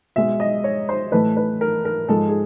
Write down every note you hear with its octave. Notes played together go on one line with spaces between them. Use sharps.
B2 G#3 E5
D#5
C#5
C5
A2 E3 A3 B4
B4
A#4
A#4
G#2 F3 G#3 A4
G#4